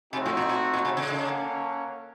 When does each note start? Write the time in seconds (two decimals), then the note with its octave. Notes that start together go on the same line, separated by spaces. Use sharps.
0.13 C3 A3 C4 D#4 F#4
0.26 A2
0.37 A#2
0.49 A#2
0.74 A#2
0.85 C3
0.97 C#3
1.10 A#3 C#4 A4 C#5 F#5